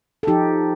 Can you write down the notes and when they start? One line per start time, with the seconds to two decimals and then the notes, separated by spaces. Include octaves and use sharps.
0.23 A4
0.27 F3 D#4 G4